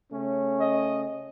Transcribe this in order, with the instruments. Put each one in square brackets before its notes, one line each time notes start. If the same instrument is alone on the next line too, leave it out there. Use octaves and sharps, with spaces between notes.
[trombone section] C#3 A3 C#4
[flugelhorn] D#5